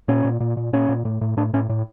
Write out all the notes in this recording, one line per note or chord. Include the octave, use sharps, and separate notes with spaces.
A#2 C#4
A#2
A#2
A#2
A#2 C#4
A#2
A2
A2
A2 D4
A2 C#4
A2